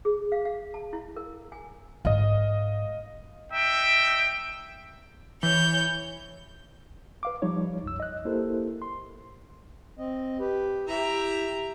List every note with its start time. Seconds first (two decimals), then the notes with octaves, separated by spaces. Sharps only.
0.05 G#4
0.32 F5
0.45 F5
0.74 A5
0.93 E4
1.16 A#4
1.52 G#5
2.05 G#1 D#5 F5
3.51 D#4 E5 G5
5.43 E3 C#5 G6
7.23 B4 F5 D6
7.42 F3 G3 D#4 C#5
7.83 C2 F#2 E6
8.00 D#5 F#6
8.25 A#3 E4 G4 A4 A#4 C5
8.82 C6
9.99 C4 D#5
10.40 G4 B4
10.88 E4 G4 E5 A#5